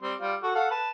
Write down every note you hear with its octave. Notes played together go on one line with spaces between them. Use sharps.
G3 C4 C6
G3 F4
F#4 A4
A4 F5 F#5
B4 A5